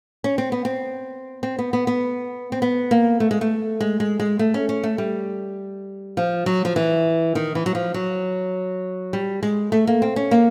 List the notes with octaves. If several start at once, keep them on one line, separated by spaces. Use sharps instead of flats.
C#4
C4
B3
C4
C4
B3
B3
B3
C4
B3
A#3
A3
G#3
A3
G#3
G#3
G#3
A3
C#4
C#4
A3
G3
F3
F#3
F3
E3
D#3
E3
F#3
F3
F#3
G3
G#3
A3
A#3
C4
C#4
A#3